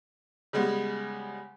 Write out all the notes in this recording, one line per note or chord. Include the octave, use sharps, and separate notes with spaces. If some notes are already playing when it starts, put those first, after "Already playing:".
C#3 G3 G#3 B3